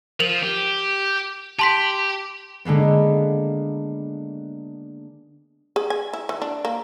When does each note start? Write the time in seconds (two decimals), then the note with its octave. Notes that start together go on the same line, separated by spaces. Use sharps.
0.20 F3 A#4 F7 F#7
0.43 G4
1.59 G4 A5 C6 B6
2.65 D3 G#3 A#3 B3
5.76 G#4
5.90 G#5
6.13 E4
6.29 E3
6.42 D4
6.65 A#3